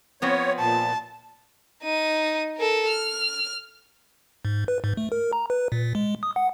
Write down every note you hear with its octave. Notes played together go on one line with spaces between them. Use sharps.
F3 B3 C4 C#5
A#2 A5
D#4 D#7
A4 A#4
F6
G#2
B4
G#2
A3
A#4
A#5
B4
A#2
G#3
D#6
F#5